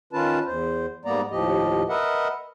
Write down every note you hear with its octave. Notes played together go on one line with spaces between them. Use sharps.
D#3 C#4 F4 B4 A5
E2 C5
G#2 G3 A#3 B3 D5 A#5
D#2 A2 F3 G4 D#5
A#4 B4 D#5 E5 F#5